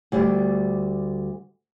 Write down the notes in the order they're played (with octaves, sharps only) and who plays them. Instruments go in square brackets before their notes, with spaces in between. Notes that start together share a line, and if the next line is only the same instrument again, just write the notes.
[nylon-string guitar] D2 G3 D5